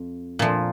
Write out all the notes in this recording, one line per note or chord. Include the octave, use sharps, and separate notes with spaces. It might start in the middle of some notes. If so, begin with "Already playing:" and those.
Already playing: F2
A#2 F3